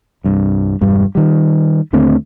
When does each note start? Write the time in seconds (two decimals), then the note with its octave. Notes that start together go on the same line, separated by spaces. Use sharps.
0.24 C2 G2
0.81 E1 G2 G3
1.15 D#3 G3
1.93 D#2 D3 A3 C4